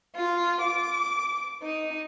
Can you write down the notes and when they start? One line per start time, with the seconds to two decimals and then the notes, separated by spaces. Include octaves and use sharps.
0.16 F4
0.61 D6
1.62 D#4